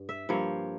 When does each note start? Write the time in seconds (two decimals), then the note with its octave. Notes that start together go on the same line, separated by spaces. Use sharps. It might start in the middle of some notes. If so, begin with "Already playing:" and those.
Already playing: G2
0.09 E5
0.29 G2 F3 A#3 C#5